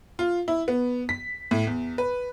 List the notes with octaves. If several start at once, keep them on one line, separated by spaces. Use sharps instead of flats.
F4
E4
B3
B6
A2
E2
B4